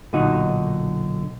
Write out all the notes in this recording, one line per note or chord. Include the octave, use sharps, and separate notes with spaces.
B1 A#2 D3 D#3 D#4 F#4